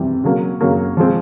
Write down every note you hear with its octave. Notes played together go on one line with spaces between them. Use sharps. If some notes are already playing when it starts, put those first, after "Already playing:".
Already playing: C3 E3 G3
C#3 F#3 A#3
C#3 F#3 A#3
F3 G#3 C4